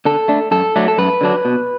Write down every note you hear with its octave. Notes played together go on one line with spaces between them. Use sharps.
D3 A4
A3 D4
F#2 A4
F#3 A3 D4
A4
F#2 B4
D3 F#3 D4
B2